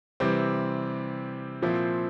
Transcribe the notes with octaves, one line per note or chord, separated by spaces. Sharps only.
C3 E3 G3 C4
A#2 F3 C4 E4